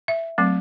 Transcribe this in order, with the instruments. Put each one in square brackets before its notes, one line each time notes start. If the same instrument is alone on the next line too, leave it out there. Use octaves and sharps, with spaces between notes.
[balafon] E5
F#3 A3 C4